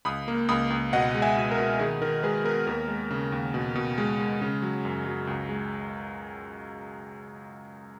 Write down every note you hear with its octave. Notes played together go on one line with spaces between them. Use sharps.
C#2 B5 D#6
A#3
C#2 B5 D#6
C#2
B2 D#5 F#5
G#3
E5 G#5
B2
A#4
B2
D#3 G#4
D#3 A#4
G#3 G#4 B4
B3 A#4
D#2 A#4
G#3
C#3
D#2
B2
B2
G#3
G#3
C#3
F#3
F#2
F#3
C#2
G#3